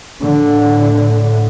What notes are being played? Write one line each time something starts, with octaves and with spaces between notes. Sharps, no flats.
A2 D3